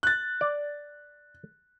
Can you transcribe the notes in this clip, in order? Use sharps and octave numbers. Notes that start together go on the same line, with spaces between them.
F#6 A6
D5